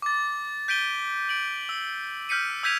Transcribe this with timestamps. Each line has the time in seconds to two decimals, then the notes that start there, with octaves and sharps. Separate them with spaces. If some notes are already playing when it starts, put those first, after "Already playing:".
0.02 D6 A6
0.68 G6 B6 D7 D#7 G7
1.29 D7 F#7
1.69 E6
2.29 F6 G6 B6 C#7 D#7
2.63 E6 G6 G#6 B6 D#7 F7